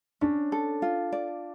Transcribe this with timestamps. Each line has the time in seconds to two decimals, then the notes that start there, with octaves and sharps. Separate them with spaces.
0.21 C#4 D4
0.52 A4
0.82 F4
1.12 D5